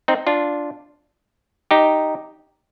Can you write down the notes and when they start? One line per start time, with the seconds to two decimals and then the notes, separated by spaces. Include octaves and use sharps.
0.08 C4 D#4
0.27 D4 F4
1.71 D#4 G4